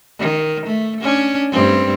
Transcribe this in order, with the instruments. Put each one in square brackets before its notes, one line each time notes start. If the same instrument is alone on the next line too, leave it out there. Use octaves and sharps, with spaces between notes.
[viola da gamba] D#3
A3
C#4 D4
G2 A3 C4